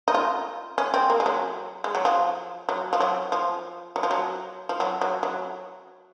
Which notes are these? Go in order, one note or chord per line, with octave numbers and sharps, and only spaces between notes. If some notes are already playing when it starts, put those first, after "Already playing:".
D#4
F4
C#4
C4
A#3
G#3
F#3
G#3
F#3
F3
F#3
F3
F#3
F3
F#3
F3
F#3
F3
F#3
F#3
F#3